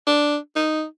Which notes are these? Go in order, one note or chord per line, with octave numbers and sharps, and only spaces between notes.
D4
D#4